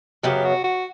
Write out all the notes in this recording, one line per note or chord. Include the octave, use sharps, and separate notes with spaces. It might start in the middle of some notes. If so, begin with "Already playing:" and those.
F#2 C#3 F#3 B3 G4
F#4
F#4